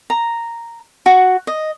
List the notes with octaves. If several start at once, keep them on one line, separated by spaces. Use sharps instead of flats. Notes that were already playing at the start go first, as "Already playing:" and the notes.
A#5
F#4
D#5